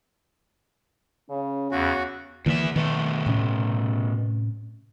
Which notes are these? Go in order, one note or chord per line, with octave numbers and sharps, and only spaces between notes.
C#3 C#4
E2 C#3 F#4
E2 D3 E3 A#3 E5
B2 D#3 A3
A2 C3 C#4